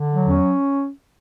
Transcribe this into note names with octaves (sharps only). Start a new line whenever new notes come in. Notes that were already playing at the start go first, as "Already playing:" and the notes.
Already playing: D3
F#3
E2 C#4